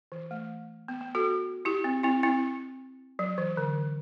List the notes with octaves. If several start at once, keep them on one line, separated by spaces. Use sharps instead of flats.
E3
A3
B3
B3
F#4 A4
E4 G4
C4
C4 E4
C4 E4
F#3
E3
D3